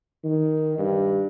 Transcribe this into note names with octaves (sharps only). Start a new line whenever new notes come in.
D#3
G2